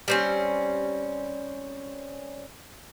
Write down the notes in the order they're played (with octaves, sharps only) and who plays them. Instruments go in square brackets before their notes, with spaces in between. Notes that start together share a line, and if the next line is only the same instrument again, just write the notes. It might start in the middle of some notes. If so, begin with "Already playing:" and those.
[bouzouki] G3 C4 C#4